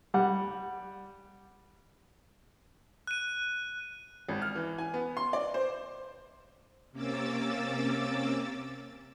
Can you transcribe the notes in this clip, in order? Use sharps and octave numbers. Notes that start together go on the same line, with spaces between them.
G3 F#5
F#6 D#7
G#1
F6
E3
G#5
B3
C6
D5
C5
C3 A#3 C#4 D6 E6 A6